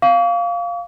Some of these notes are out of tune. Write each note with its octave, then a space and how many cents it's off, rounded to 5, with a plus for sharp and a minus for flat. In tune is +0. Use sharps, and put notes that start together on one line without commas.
F5 +0 C#6 +45